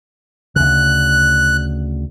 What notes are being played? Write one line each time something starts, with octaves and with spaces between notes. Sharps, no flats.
D2 C#3 F#6